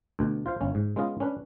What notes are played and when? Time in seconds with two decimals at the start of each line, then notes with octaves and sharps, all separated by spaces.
0.19 D2 B2
0.46 F4 C5 F5
0.61 G1 C#4
0.75 G#2
0.96 G#3 B3 C#4 F4 D#5
1.20 C#4 D4 B4